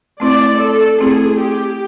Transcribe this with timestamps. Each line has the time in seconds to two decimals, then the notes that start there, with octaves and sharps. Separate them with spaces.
0.20 A3 C4 E4 D5
0.59 A4
0.98 A3 C4 E4 G#4
1.37 G4